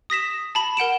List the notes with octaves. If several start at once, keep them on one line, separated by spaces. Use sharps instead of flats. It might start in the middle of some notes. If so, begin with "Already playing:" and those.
D#6 A#6 B6 E7
A5 B5
A#4 F#5 D7 E7